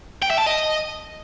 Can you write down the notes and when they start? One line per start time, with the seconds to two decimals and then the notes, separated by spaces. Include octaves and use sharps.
0.22 G5
0.30 E5
0.39 A5
0.47 D#5